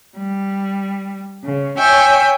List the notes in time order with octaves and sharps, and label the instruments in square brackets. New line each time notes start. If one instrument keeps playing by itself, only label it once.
[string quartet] G3
C#3
C#5 E5 G5 G#5